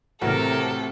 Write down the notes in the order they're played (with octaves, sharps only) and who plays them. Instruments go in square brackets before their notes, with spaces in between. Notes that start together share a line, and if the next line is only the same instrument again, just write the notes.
[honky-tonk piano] A2 E3 F#4 [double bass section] C3 [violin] A4 [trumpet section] A#4